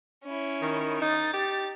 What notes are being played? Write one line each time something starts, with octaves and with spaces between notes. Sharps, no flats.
C#4 E4
D#3
D#4 A6
G4